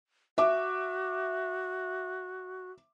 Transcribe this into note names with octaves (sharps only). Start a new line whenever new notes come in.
F#4 E5 D6